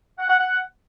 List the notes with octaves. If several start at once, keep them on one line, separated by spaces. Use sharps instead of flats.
F#5
F#5
F#5